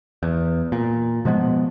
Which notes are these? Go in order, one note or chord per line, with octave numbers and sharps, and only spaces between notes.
E2
A#2
B2 F3 G#3 B3